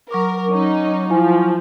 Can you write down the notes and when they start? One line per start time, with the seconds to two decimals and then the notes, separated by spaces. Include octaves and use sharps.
0.11 F#3 A#4 C#6 D6
0.51 C#4 D#4
1.10 F3 E4 G#5